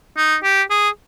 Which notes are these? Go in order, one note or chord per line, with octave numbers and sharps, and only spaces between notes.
D#4
G4
G#4